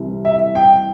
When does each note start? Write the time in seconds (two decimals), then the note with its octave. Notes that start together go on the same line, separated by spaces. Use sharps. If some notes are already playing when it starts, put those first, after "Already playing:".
Already playing: C2 C3 E3
0.25 E5
0.55 G5